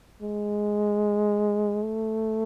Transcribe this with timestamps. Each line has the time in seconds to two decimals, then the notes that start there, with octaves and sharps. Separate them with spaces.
0.22 G#3
1.84 A3